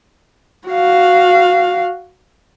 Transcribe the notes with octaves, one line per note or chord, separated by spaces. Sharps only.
F#4 F5